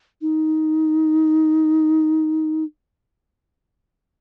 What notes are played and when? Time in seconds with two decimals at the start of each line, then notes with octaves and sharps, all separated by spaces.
0.22 D#4